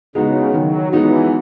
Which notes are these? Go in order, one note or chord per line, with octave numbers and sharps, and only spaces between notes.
C#3 G#3 B3 D#4 F#4
D#3 F#3
E3 G#3 B3 D#4 F#4